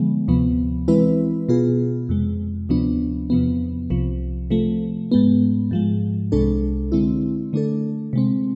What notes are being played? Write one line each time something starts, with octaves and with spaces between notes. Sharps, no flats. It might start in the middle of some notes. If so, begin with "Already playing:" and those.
Already playing: D3 F3 G#3 B3
D2 C3 F3 B3
E3 G#3 C4 E4 B4
B2 B3 F4 G#4
F2 C3 G#3
D2 C3 F3 B3 D4
E2 C3 F3 B3
C2 C3 F3
C3 F3 A3
G#2 G#3 B3
G#2 F3 G#3
C2 C3 G#3 D4 A4
D3 G#3 C4 E4
D3 A3 D4 A4
C3 G#3 C4